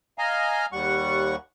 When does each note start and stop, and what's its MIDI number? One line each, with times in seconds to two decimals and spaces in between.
0.18 0.66 75
0.18 0.66 77
0.18 0.66 80
0.18 0.66 82
0.72 1.36 39
0.72 1.36 55
0.72 1.36 78
0.72 1.36 85